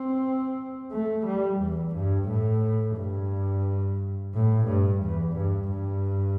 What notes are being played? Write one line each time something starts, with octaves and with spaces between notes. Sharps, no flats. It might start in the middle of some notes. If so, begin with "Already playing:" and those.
Already playing: C4
A3
G3
E2
G2
A2
G2
A2
G2
E2
G2
G2